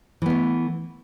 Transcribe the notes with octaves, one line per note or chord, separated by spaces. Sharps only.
E3 A3 B3